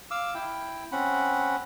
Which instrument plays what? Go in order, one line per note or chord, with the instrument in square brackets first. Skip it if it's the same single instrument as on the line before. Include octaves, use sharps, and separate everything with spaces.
[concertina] F5 D6 E6
E4 G5
C4 C#4 F#5 B5